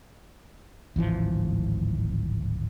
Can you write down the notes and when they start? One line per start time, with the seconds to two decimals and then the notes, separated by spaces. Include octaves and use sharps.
0.96 D1 G#1 E3 F3